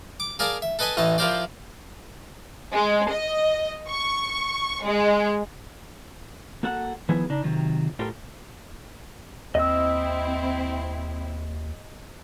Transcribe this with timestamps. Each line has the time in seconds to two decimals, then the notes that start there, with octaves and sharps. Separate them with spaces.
0.20 D6
0.39 G#4 A#4 D5 F5 A5 A#5
0.62 E5
0.79 A4 B4 D#5 G#5 A5 B5
0.97 A1 A2 E3 D#5 A5
1.18 F3 E4 G4 A#4 C5 D5
2.74 G#3
3.12 D#5
3.88 C#6
4.83 G#3
6.63 A#3 F#4 A4 F#5
7.09 D#3 F3 B3 E4 G#4 B4
7.30 C#3 D4 D#4
7.44 C3 D#3 F#3 F4
7.99 A2 F4 G4 A4 A#4
9.55 D#2 C4 E4 D#5 E6